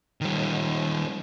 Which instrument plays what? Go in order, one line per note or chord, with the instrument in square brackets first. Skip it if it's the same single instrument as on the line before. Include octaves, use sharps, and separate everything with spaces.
[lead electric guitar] D#3 G3